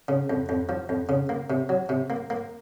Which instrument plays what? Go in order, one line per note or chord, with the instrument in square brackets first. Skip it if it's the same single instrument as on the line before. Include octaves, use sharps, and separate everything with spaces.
[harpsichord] C#3
F2
F2
F3
F2
C#3
A#3
C3
F#3
C3
A#3
A#3